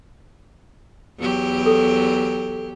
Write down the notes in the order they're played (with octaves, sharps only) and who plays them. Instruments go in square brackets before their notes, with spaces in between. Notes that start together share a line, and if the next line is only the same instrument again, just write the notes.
[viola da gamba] E2 F#3 G4
[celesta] A4